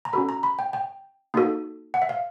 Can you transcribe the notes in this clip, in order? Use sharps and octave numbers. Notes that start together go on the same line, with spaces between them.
A#5
C#4 F#4 A4 B5
A#5
B5
G5
G5
A#3 D#4 F#4 A4
F#5
E5
F5